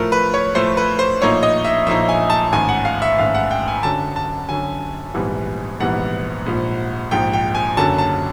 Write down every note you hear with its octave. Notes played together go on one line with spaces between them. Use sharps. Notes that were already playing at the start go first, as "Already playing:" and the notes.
Already playing: A2 F3 A3 A#4
B4
C#5
A2 F3 A3 C5
B4
C5
A#1 A2 F3 A#3 D#4 C#5
D#5
E5
A#1 A2 F3 A#3 D#4 E5
G#5
A5
A1 G#2 D#3 G#5
F#5
F5
E5
A1 G#2 D#3 F5
F#5
G5
G#5
F#2 D3 F#3 A5
A5
F#2 D3 F#3 G#5
A#1 G#2 E3 G3 B3
A#1 G#2 E3 G3 B3 F#5
A#1 G#2 F3
A#1 G#2 F3 G5
G5
G#5
F#1 F#2 D3 F#3 A5
A5